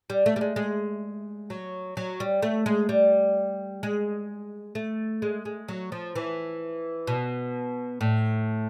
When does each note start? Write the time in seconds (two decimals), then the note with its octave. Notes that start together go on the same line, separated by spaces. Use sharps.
0.10 G3
0.26 A3
0.36 G3
0.41 G#3
0.56 G#3
1.50 F#3
1.97 F#3
2.20 G3
2.42 A3
2.66 G#3
2.89 G3
3.83 G#3
4.75 A3
5.22 G#3
5.45 G#3
5.68 F#3
5.92 F3
6.15 E3
7.07 B2
8.01 A2